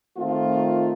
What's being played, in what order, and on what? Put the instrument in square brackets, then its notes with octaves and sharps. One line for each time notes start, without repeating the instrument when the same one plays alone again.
[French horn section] D#3 A3 C4 F4